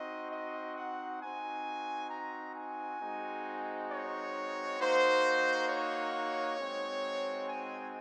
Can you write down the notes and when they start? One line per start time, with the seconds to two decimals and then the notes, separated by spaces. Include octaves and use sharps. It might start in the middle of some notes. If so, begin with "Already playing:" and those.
Already playing: C4 D#4 F#4 D#5
0.32 D#5
0.76 F#5
1.21 C4 D#4 F#4 G#5
2.11 A#5
2.56 G#5
3.00 G#3 C4 D#4 F#4
3.89 C#5
4.79 A#3 D#4 F#4 C5
5.69 C#5
6.57 G#3 C4 D#4 F#4
7.46 G#5